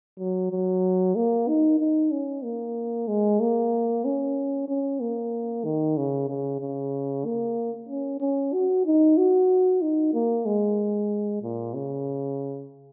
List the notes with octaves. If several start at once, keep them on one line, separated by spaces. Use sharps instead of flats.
F#3
F#3
A#3
D#4
D#4
C#4
A#3
G#3
A#3
C#4
C#4
A#3
D#3
C#3
C#3
C#3
A#3
C#4
C#4
F#4
D#4
F#4
D#4
A#3
G#3
A#2
C#3